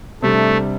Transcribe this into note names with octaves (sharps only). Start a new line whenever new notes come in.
C3 G3 A3 D4